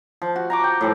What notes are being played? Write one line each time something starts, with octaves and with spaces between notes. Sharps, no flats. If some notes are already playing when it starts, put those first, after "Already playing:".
F3
F#4
A#5 C#6 D6
G5
A2 F3 G3